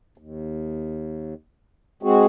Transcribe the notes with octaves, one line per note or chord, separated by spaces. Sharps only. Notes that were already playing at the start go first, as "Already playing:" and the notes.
D#2
G#3 C4 F#4 G#4